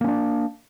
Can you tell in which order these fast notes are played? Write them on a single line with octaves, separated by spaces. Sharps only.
A#3 C#4 D4